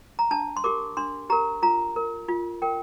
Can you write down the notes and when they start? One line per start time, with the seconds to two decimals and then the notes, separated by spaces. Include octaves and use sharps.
0.19 A#5
0.31 D4 A5
0.57 C6
0.64 G4 A#4 D6
0.97 D4 C6
1.30 G4 A#4 A#5
1.62 F4 A#5
1.96 A#4
2.28 F4
2.62 A#4 G5